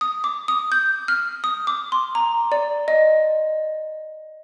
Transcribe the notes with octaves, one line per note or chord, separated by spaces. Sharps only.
D#6
D6
D#6
G6
F6
D#6
D6
C6
A#5
D5
D#5